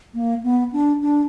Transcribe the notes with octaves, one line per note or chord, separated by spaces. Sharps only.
A#3
B3
D4
D4